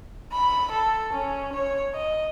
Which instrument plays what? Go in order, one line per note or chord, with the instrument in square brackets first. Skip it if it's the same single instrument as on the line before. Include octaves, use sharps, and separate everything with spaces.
[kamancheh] B5
A4
C#4
C#5
D#5